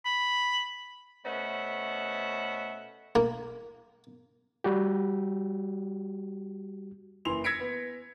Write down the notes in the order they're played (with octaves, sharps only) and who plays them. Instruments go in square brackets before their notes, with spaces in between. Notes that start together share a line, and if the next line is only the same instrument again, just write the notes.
[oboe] B5
[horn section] B2 A3 C#4 C5 E5 F#5
[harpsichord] A#3
[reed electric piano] G3 F#4 G4
[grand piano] F#1 E3 E4 C6 F7
E6 G#6 A#6 B6 C#7 D7
B3